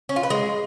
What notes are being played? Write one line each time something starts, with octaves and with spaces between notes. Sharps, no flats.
C#4
F4
B4
G#3